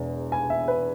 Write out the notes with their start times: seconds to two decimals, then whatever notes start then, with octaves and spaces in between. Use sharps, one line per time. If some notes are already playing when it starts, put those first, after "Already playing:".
Already playing: E1 E2
0.32 G#5
0.50 E5
0.68 B4